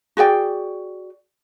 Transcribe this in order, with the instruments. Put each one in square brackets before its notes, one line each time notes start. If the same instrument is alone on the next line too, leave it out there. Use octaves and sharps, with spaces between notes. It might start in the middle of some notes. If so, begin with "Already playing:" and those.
[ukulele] F#4 G#4 D5 G5